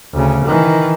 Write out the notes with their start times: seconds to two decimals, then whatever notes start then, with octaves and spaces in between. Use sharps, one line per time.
0.13 D2 C#3
0.45 D#3 E3